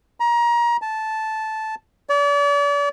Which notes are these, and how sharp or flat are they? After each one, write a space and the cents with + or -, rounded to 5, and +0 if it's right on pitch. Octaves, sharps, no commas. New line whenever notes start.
A#5 +25
A5 -10
D5 -40